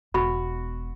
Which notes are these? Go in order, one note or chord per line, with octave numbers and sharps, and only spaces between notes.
E1 B2 F#4 B5